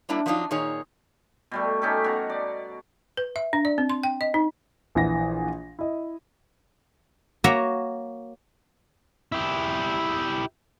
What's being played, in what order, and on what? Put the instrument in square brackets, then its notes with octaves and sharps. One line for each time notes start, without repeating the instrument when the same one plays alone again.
[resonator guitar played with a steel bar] F#3 G3 A#3 D4 E4
F3 F#3 D4 D#4 F4
A#2 D#3 D#4 G#4 C#5
[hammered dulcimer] B2 G3 A3
C#4 D#4 G4 A4
B2 F#4 A#5
D5
[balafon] B4
E5
D4
D5
C4
C6
G5
D#5
D#4
[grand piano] A#1 E3 F#5 A#6
E4 D#5
[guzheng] A#3 F#4 C#5 E5 A#5
[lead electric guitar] E4 G4